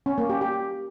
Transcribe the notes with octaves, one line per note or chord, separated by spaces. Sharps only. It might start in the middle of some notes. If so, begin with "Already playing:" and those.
C#4
A#3
G4
G4